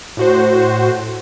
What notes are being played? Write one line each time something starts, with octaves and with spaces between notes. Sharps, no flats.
A2 F#4 C5